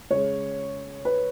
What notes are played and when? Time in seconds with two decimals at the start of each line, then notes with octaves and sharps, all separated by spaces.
0.11 C#3 G#3 C#5
1.05 B4